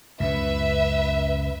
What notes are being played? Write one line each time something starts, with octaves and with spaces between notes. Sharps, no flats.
C#2 F#2 C#3 B4 E5